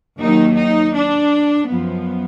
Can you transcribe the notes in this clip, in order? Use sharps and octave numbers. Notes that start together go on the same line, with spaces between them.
D#2 D#3 F#3 D#4
D#4
D4
F#2 F3 B3